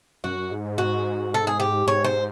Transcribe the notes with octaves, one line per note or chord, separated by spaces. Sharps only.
F#2 F#4
G#2
F#4
A4
G#4
G4
G#2 C#5
C5